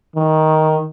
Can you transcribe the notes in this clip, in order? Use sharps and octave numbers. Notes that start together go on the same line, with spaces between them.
D#3